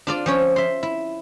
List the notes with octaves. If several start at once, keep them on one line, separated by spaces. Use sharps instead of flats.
D4 F4 D5
F3 C#4 C#5
E5 C6
E4